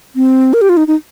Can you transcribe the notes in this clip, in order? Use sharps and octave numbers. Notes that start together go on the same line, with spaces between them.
C4
A#4
G4
F4
D#4
D#4